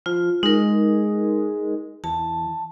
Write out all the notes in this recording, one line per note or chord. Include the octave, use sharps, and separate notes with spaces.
F3 F4
G#3 D#4 A#4
E2 A5